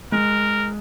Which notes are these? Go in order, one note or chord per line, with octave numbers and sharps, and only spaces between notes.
G#3 A#4